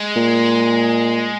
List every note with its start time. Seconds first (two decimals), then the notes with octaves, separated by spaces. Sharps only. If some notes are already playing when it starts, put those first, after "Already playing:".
Already playing: G#3
0.16 A#2